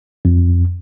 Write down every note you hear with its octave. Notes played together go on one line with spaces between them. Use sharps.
F2